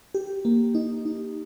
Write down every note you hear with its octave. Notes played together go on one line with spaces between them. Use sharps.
G4
A#3
D#4
D#4